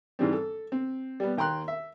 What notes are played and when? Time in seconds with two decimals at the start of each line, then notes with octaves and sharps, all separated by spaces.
0.19 G#2 E3 G3 C4
0.33 A4
0.72 C4
1.20 G3 B3
1.37 D#2 G5 A#5 C6 F#6
1.68 E5